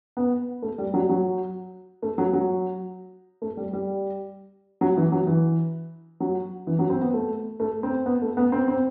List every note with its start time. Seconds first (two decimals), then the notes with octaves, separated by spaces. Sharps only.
0.17 B3
0.62 A3
0.78 G3
0.94 F#3
1.09 F#3
2.02 A3
2.18 F#3
2.33 F#3
3.42 A3
3.57 G3
3.73 G3
4.81 F#3
4.97 E3
5.12 F#3
5.27 E3
6.20 F#3
6.67 E3
6.79 F#3
6.90 C4
7.01 B3
7.14 A3
7.60 A3
7.83 C4
8.06 B3
8.22 A3
8.37 B3
8.52 C4
8.68 C4